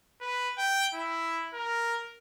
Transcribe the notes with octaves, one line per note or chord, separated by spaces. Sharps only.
B4
G5
E4
A#4